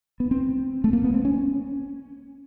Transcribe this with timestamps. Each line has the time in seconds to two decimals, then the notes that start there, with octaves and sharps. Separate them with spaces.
0.20 B3
0.31 C4
0.84 A3
0.93 A#3
1.04 B3
1.14 C4
1.25 C#4